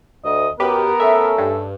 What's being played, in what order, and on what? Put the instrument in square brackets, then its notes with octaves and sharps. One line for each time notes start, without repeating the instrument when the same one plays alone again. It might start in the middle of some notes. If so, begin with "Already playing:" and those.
[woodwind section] D2 [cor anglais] D#5
[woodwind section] F#2 [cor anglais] B3 [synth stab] G4 B4 [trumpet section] A#4
[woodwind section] A3 C#4 A4 [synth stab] E5
[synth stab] G2